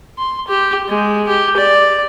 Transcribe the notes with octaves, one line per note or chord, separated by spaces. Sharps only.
C6
G4
G#3
G4
D5